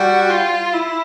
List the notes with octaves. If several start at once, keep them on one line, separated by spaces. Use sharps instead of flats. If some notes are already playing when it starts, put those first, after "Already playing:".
Already playing: G3 F#4
F4
E4